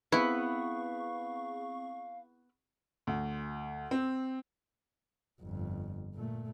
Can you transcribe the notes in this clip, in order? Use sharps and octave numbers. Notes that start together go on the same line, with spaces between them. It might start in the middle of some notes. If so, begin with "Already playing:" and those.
B3 C4 E4 G#4 B4 F5 C#6
D2
C4
G1 F2
A#2 A3